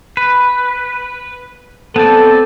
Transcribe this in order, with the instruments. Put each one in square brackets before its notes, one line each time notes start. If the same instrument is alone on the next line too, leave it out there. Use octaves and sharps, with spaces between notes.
[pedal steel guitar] B4
[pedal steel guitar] B3 C4 D5 [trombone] A4